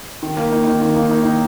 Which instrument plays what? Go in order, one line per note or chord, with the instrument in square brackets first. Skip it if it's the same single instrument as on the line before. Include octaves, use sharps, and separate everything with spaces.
[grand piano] D#3
A#3
D#4
D#3
D#3
A#3
D#4
D#3